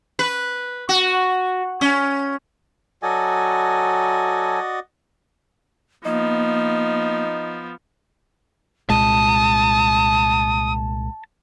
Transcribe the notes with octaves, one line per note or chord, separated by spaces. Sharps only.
B4
F#4
C#4
F#3 F#4 A4 D5 D#5 G#5
F3 A#3 B3 D#4
C2 A#2 G#3 A5 D#6